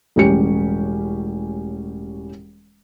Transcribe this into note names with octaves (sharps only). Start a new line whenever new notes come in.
E1 A2 G3 C#4 G4 C#7